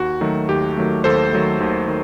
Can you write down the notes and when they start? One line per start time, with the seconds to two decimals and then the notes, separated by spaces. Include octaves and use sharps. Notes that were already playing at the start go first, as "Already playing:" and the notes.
Already playing: D#2 F#4
0.21 D#3 F#3 A3
0.49 D#2 G4
0.77 D#3 F#3 A3
1.04 D#2 A4 C5
1.33 D#3 F#3 A3
1.60 D#2
1.88 D#3